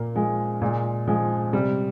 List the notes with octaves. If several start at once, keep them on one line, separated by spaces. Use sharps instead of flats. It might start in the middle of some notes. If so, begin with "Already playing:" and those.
Already playing: A#2 A#3
F3 G#3
A#2 G#3
F3 G#3
C3 G3